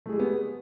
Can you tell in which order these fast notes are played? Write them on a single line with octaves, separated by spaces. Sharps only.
A3 G#4 G#3 G4 B3